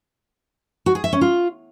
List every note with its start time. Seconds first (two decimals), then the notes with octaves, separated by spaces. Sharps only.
0.86 F#4
0.95 G#4
1.04 E5
1.13 C#4
1.21 F4